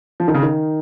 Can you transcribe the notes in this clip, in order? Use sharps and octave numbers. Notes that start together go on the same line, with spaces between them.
F3
D#3
C#3
D#3